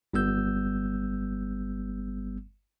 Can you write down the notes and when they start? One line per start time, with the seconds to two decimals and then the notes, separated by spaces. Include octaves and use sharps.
0.13 G1 G3 B3 E6 G6